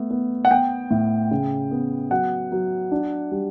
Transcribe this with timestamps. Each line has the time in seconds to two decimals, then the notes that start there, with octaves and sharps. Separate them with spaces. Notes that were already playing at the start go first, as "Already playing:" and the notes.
Already playing: A3 B3
0.10 B3
0.45 F#5
0.51 B3 G5
0.91 A2
1.31 C#3
1.71 B3
2.11 F#3 F#5
2.52 F#3
2.92 D4
3.32 G3